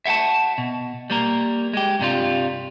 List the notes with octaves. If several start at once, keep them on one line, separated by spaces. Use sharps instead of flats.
E5 F#5 G5 A5
B2
G3 A#3 A#4
G#3 G4
G2 C3 G3 F4